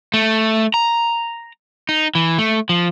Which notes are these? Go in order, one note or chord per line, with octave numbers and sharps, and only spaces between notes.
A3
A#5
D#4
E3
A3
F3